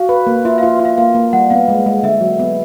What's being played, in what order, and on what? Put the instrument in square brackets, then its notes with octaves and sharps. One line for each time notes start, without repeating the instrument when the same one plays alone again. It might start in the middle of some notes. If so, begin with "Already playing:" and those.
Already playing: [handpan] F#4 [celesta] F5
[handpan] B4
A#3
[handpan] F4 [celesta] E5
[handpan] F4 [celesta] F5
[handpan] F4
[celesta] F5
[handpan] A#3 [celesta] F5
[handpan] A#3
[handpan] G3 [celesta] F#5
[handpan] B3 [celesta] F5
[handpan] G#3
G#3
[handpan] D3 [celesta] E5
[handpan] F#3
B3